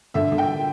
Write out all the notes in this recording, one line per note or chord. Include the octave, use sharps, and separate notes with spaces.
D3 E5
D3
G5